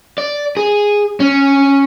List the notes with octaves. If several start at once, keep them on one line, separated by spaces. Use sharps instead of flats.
D5
G#4
C#4